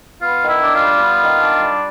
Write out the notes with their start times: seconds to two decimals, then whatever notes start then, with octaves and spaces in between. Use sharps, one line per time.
0.22 B3 F4
0.42 D#3
0.48 E4
0.62 D4
0.75 F4
0.82 G3
1.02 B3
1.21 D#3
1.41 D4
1.61 G3